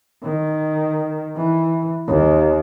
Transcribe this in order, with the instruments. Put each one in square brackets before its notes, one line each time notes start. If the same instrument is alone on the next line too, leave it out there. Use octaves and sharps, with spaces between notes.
[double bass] D#3
E3
D#2